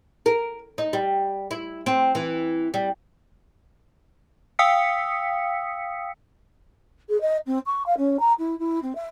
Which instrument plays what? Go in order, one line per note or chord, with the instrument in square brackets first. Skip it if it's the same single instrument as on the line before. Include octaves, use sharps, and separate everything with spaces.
[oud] A#4
D#4
G3
E4
C4
E3
G3
[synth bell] F5 G5 D#6 E6 B6 C#7
[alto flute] G#4
D#5
C4
C#6
F5
C#4
A#5
E4
E4
C4
E5